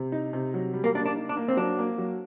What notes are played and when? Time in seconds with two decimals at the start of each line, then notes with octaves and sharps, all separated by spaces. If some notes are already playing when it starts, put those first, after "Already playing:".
Already playing: C3
0.12 D#4
0.33 C3
0.54 F#3
0.74 G3
0.84 A#3
0.95 A#3 D4
1.06 D4
1.16 D#4
1.29 D4
1.37 A#3
1.48 C4
1.57 F#3 D4
1.78 A#3
1.98 F#3